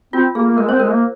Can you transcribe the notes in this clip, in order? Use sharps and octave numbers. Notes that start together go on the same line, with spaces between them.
C4 F4
A#3 G#4
A#3
G#3 A#4
C4 C5
G#3 A#4
A#3